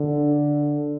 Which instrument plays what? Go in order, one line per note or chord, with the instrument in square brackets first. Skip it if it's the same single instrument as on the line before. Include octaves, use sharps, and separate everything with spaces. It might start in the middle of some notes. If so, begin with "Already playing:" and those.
Already playing: [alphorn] D3